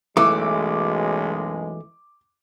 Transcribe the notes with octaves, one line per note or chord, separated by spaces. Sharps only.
B1 F#2 E3 G#3 A3 D6